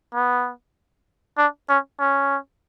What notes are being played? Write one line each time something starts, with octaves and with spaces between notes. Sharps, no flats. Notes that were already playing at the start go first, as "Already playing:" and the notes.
B3
D4
C#4
C#4